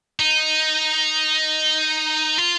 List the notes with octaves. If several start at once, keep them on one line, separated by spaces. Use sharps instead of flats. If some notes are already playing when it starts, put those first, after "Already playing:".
D#4
F4